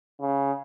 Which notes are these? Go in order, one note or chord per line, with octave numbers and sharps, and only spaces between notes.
C#3